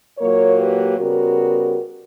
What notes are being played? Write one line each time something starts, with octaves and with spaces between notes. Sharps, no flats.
A#2 F#3 A#3 A#4 C#5
G4 B4
C#3 G3 B3 F#4 A#4